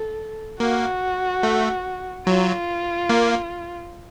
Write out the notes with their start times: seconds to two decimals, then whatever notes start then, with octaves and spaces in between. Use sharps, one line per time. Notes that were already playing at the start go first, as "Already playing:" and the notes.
Already playing: A4
0.60 A#3 F#4
1.43 A3
2.26 F#3 F4
3.09 A#3